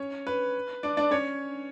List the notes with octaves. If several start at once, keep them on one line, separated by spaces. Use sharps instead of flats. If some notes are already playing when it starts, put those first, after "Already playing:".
Already playing: C#4 C#5
B4
D4 D5
D4 D5
C#4 C#5